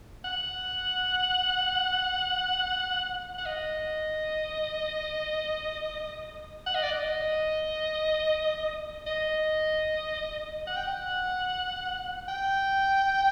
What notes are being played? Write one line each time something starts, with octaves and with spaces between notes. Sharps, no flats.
F#5
F#5
D#5
F#5
D#5
D5
D#5
D#5
F#5
G5
F#5
G5